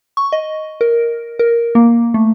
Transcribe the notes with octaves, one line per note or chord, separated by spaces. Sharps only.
C#6
D#5
A#4
A#4
A#3
A3